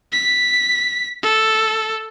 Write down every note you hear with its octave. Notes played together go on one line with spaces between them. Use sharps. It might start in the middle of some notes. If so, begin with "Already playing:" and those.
B6
A4